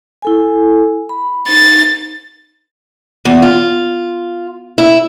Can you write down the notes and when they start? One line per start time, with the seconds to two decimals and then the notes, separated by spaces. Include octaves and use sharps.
0.22 E4 A4 G#5
1.09 B5
1.49 D#4 A6
3.25 E2
3.42 F4
4.78 E4